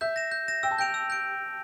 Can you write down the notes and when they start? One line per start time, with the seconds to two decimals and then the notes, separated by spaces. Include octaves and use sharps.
0.01 E5 G6
0.16 A#6 E7
0.31 G6
0.48 A#6 E7
0.63 G5 E6
0.71 A5
0.78 G5 G6 D7 F7
0.94 E6
1.10 G6 D7